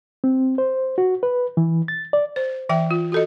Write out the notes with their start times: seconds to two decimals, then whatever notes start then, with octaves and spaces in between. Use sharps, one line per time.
0.24 C4
0.58 C5
0.98 F#4
1.23 B4
1.57 E3
1.88 A6
2.13 D5
2.36 C5
2.69 E3 E5 G5
2.91 F4
3.12 F#4 A4 D#5